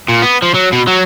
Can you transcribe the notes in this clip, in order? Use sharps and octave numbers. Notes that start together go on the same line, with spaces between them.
A#2
B3
F3
F#3
B2
F#3